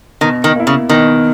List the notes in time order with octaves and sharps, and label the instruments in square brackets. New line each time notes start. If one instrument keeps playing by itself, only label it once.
[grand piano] B2 [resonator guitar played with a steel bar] D#3
[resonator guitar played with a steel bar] D#3
[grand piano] A#3 E4
[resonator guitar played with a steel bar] C#3
[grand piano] B2 [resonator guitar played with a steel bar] D#3